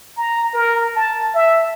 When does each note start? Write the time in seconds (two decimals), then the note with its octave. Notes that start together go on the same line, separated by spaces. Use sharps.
0.17 A#5
0.54 A#4
0.96 A5
1.35 E5